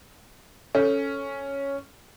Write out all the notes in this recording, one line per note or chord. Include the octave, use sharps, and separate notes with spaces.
C#4 A4